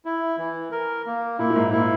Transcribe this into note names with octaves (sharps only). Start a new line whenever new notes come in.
E4
E3
A#4
A#3
A#2 E4
A#2
G#2
A#2 E4